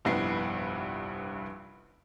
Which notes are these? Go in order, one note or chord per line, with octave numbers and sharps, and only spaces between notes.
F1 A#1 G2 B3 E4 C7